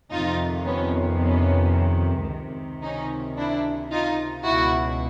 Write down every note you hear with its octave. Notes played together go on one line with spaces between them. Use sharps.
F2 C3 D#3 D#4 F4
B3 C#4
B3 C#4
C#2 C3 D#3
C#4 D#4
D4 E4
D#4 F4
C#2 B2 E4 F#4